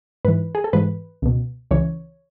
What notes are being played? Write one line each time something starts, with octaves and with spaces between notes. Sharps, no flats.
G#2 E3 B4
G#4
A4
G#2 E3 B4
C#2 B2
C#2 C#3 E3 C#5